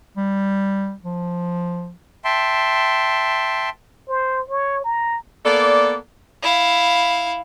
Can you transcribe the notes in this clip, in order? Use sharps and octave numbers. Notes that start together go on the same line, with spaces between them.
G3
F3
E5 G5 A5 C6
C5
C#5
A#5
A#3 B3 A4 D5
E4 F5